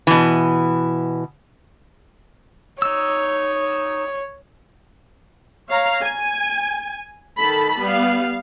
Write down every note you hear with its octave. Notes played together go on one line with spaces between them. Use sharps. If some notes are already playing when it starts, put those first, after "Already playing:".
B2 E3
D#4 C#5 E6
C#5 F5 A#5
G#5
D#3 A4 A5 B5
G3 B3 F5